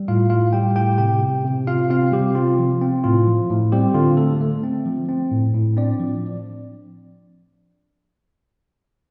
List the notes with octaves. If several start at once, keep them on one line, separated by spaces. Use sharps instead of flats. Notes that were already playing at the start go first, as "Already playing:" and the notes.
Already playing: G3
A2 F4 F5
A2 F4 F5
G3 G4 G5
A2 G4 G5
C3 G4 G5
C3
C3
C3 F4 F5
C4 F4 F5
C3 G3 G4
C4 F4
F3
C4
A2 F4
F3
A2
G3 C4 G4
D3 F4
A3 A4
A3
C4
F3
C4
A2
A2
C4 D4 D5
F3